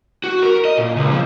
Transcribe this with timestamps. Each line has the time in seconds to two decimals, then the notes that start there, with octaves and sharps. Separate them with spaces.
0.24 F#4
0.42 A#4
0.65 D#5
0.77 A#2
0.96 C#2
1.11 F3